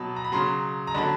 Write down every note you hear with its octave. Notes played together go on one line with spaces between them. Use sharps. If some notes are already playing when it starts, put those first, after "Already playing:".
Already playing: B2 F#3 A5 B5
A#5
B5
C#3 F#3 A#5 C6
A#5
D3 F#3 A5 B5